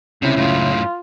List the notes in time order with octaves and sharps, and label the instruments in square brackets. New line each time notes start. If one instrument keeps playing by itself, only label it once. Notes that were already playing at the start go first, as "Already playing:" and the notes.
[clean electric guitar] C#2 C#4 E4 [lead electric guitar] C3
[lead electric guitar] F#2 A2 [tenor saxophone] F4